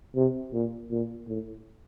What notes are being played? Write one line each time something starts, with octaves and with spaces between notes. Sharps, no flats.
C3
A#2
A#2
A2